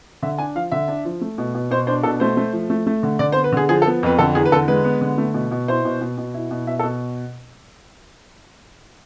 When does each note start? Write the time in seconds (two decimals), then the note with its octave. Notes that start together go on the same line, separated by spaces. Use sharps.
0.23 D3 E5
0.38 D4 G#5
0.55 F3 F5
0.72 D3 E5
0.88 D4
1.05 F3
1.21 A3
1.38 B2
1.54 B2
1.71 B2 C5
1.87 D4 C5
2.03 B2 A4
2.20 A3 C5
2.37 A3
2.53 F3
2.70 A3
2.87 A3
3.03 D3
3.19 D3 D5
3.32 C5
3.36 B3
3.44 B4
3.53 D3 G#4
3.69 F3 G#4
3.82 A4
3.86 B3
4.03 F2 B4
4.19 D3 A4
4.35 E2 G#4
4.46 B4
4.52 D3 A4
4.68 G#3 B4
4.85 B3
5.01 D3
5.18 A3
5.34 B2
5.51 B2
5.68 E4 C5
5.85 B2
6.01 B2
6.18 B2
6.34 E4
6.51 B2
6.67 B2 E5
6.79 A4
6.83 B2